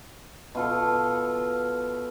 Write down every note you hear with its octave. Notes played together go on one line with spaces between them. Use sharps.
B2 F4 A4